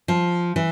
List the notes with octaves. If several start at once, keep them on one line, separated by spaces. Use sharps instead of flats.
F3
E3